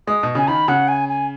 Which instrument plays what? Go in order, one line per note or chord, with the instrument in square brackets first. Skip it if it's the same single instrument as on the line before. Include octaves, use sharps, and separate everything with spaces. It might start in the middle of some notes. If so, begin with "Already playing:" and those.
[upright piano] G#3 [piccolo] D#6
[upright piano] B2
[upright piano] C#3 [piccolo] G#5
[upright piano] D#3 [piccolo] B5
[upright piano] C#3 [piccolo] F#5
[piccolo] G#5
G#5